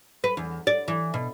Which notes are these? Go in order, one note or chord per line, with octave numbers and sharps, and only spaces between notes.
B4
E2
D5
E3
B2